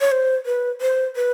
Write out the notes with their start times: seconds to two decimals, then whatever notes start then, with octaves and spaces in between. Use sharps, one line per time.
0.01 C#5
0.12 C5
0.46 B4
0.81 C5
1.16 B4